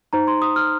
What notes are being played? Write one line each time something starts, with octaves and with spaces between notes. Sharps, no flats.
D#4 C5 A#5
C6
D#6
F6